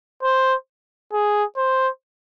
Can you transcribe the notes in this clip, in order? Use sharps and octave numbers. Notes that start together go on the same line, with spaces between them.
C5
G#4
C5